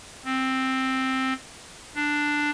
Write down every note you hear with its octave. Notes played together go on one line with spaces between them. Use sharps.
C4
D4